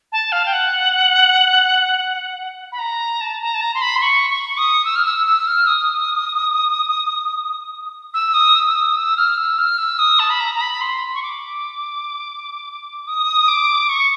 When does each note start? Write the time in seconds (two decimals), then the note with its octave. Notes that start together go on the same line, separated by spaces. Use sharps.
0.12 A5
0.32 F5
0.46 G5
0.53 F#5
2.72 B5
2.79 A#5
3.21 A5
3.41 A#5
3.54 A5
3.61 A#5
3.74 C6
3.81 B5
3.95 C6
4.02 C#6
4.30 C#6
4.57 D#6
4.85 E6
4.96 F6
5.05 E6
5.26 E6
5.47 F6
5.67 D#6
8.14 E6
8.34 D#6
8.55 E6
8.67 E6
8.75 D#6
8.96 E6
9.17 F6
9.37 E6
9.58 F6
9.78 E6
9.99 D#6
10.19 A5
10.30 B5
10.40 A#5
10.55 A#5
10.61 B5
10.81 C6
11.15 C#6
11.23 D6
13.07 D#6
13.48 D6
13.89 C#6